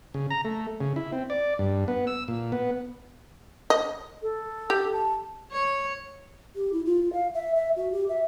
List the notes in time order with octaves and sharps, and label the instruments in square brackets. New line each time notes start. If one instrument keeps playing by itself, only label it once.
[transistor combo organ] C#3
A#5
A3
C#3
E4
C4
D5
G2
B3
E6
A#2
B3
[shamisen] D#5
[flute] A4
[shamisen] G4
[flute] A5
[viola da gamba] C#5
[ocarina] G4
E4
F4
F5
E5
E5
F#4
G4
E5